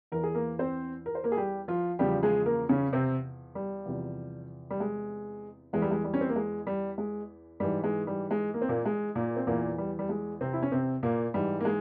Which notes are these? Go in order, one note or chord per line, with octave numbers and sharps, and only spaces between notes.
E2 E3 A#4
G#4
A#3 A#4
C4 C5
A#4
C5
A#3 A#4
G#4
G3 G4
F3 F4
E2 C#3 F3 G3 G4
G#3 G#4
A#3 A#4
C#3 C#4
C3 C4
G3
E2 C3 F3
G3
G#3
E2 E3 G#3
G3
G#3
G3
C#4
C4
A#3
G#3
G3
G#3
G#2 E3 G3
G#3
G3
G#3
A#3
C4
A#2 A#3
G#3
A#2 A#3
C4
E2 A#2 E3 A#3
G3
G3
G#3
C3 C4
E4
C#4
C3 C4
A#2 A#3
G#2 E3 G3
A#3
G#3